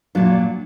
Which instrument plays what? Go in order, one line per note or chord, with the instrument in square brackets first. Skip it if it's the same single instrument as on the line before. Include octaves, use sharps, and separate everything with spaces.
[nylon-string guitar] A#2 F#3 D4 F4